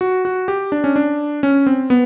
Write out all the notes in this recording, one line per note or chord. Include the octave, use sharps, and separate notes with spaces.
F#4
F#4
G4
D4
C#4
D4
C#4
C4
B3